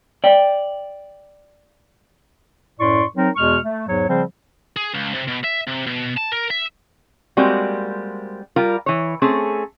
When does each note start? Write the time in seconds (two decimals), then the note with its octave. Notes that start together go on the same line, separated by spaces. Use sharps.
0.24 D5 G5
2.80 F#2 A2 D5 C6 C#6
3.17 F#3 C4 D#4 A#4
3.36 E2 B2 G#3 C#6 F6
3.64 A3
3.87 E2 G#2 F#3 C#5
4.08 C#3 F3 G3 C4 C5
4.77 G#4
4.94 C#2
5.14 C3
5.27 B2
5.44 E5
5.67 C3
5.86 B2
6.17 A5
6.32 A#4
6.50 E5
7.37 G3 G#3 A#3 C4 F#4
8.56 G3 F4 A#4
8.86 E3 C#5
9.22 A3 C4 C#4 G#4